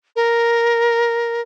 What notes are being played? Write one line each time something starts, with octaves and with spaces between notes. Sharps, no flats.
A#4